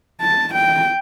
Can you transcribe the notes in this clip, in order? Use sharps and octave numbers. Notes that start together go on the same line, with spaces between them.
A5
G5